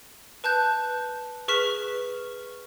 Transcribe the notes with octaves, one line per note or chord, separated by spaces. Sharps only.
B4 A5 F#6 G6
G#4 B4 C#6 F6 B6 E7